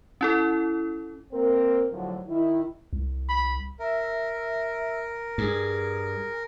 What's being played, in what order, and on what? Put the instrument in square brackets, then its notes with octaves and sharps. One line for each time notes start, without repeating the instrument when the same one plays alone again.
[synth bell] C#4 E4 A4
[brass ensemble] A#3 C4 A#4
D#2 A2 D3 F3 F#3
D#3 E4
[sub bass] C2
[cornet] B5
[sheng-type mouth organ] A#4 [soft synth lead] E5
[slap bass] G2 [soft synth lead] G#4